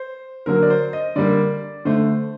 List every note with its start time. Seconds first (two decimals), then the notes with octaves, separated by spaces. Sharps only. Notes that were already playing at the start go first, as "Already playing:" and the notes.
Already playing: C5
0.46 D3 F#3 A#3 A#4
0.62 D5
0.70 C5
0.93 D#5
1.16 D3 G3 A#3 D5
1.85 D3 A3 C5